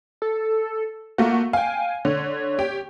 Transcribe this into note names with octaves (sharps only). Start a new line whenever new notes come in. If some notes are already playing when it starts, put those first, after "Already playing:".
A4
A3 A#3 F4 F#4
F5 G5 G#5
D3 C#5
G4 G5